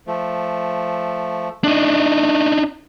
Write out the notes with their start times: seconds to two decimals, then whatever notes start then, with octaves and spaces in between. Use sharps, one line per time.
0.07 F3 A3
1.64 A3 D4 D#4